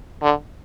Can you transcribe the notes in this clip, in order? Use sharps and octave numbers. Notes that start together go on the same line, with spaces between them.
D3